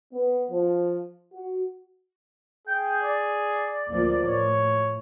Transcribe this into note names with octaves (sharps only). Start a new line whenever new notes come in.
B3
F3
F#4
G#4 G5
D5
D2 F3 A#3
A2 C#5